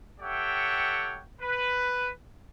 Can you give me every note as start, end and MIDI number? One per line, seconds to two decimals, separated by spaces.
0.19 1.21 67
0.19 1.21 69
0.19 1.21 73
0.19 1.21 76
0.19 1.21 78
0.19 1.21 79
1.41 2.10 71